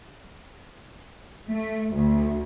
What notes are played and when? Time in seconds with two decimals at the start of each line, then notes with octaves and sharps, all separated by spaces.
1.48 A3
1.94 D2